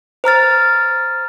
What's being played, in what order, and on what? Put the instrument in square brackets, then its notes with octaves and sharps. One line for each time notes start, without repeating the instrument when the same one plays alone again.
[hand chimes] C5 A#5 F6 A6